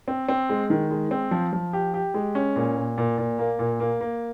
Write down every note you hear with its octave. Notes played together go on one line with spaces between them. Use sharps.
C4
C4
G#3
D#3
G#3
C4
F3
F3
G4
G4
G#3
C#4
A#2
A#2
A#2
A#2
A#3
A#2
A#3
A#3